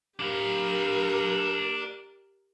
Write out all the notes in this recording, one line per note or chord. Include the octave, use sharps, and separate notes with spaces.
D4 G4 A#4 F5